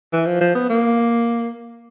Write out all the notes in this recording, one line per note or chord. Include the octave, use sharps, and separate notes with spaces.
E3
F3
F3
B3
A#3